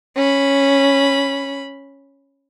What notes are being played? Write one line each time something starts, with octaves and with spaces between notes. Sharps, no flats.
C#4 B5